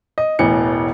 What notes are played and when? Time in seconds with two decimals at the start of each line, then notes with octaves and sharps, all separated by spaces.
0.18 D#5
0.39 E1 A1 E3 C#7